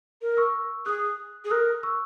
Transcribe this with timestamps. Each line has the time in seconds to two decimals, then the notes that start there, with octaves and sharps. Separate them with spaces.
0.22 A#4
0.37 C#6 E6
0.86 G#4 D#6 F#6
1.45 G#4
1.50 A#4 D#6 F#6
1.83 C#6 E6